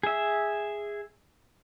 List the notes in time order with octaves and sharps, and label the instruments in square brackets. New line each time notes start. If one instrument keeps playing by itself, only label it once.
[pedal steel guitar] G#4 E5